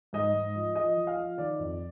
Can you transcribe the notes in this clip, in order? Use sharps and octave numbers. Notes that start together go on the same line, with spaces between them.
G#2 D#5
G#2
F3
F3 D#5
F3
F5
F3
D#3 D5
F2